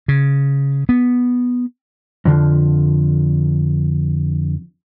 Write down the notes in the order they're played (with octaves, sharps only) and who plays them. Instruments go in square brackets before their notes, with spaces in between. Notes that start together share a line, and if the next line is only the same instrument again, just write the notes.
[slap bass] C#3
B3
[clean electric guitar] F2 D3 F3